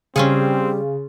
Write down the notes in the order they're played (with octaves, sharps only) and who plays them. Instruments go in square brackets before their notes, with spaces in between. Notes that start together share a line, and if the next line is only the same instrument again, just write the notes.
[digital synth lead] C#3 [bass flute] G3 [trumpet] C4 [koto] C#4 F4 G#4